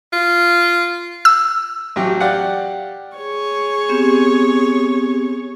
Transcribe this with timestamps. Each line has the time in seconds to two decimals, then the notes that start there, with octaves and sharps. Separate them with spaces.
0.13 F4
1.25 E6
1.96 A1 F#3 G4
2.21 G4 D5 F5 F#5
3.17 G#4 C#5
3.89 B3 C4 G4